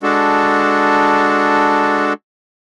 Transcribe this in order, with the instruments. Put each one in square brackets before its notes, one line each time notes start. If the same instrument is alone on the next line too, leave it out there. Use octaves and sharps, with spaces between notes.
[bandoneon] G#3 D4 F#4 A4